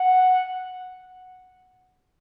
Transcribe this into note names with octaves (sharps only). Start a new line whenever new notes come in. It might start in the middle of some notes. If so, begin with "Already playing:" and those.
Already playing: F#5